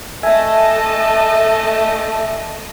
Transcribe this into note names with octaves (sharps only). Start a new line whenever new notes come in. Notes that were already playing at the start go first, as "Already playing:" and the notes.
A3 A4 D#5 E5 G#5 A5